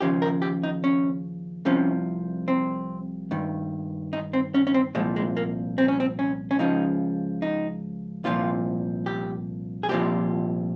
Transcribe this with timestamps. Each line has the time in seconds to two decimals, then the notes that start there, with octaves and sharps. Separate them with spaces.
0.01 D#2 C#3 F3 G4
0.22 A#4
0.42 G4
0.63 D#4
0.84 C#4
1.65 C2 C3 F3 C#4
2.48 C4
3.31 G2 D#3
4.13 D#4
4.33 C4
4.54 C#4
4.67 C#4
4.74 C4
4.95 C2 A#2 F3 G#3
5.16 G#3
5.37 A#3
5.78 C4
5.88 C#4
6.00 C4
6.19 C#4
6.51 C#4
6.59 C#2 C#3 F3 D#4
7.42 D#4
8.24 C2 A#2 F3 F4
9.06 G4
9.83 G#4
9.89 C2 A#2 F3 G4